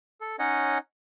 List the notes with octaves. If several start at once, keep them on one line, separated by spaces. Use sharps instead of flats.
A4
C#4 D#4 C#5 D#5 F#5